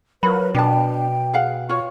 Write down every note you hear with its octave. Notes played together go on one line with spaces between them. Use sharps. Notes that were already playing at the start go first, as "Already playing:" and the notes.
F#3 F4 A#4 B4 B5
B2 D4 G5 A5
G#4 F5 F#5
F4 C#5 C#6